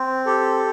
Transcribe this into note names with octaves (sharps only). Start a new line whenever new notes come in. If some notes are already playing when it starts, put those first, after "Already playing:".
Already playing: C4
G4 A4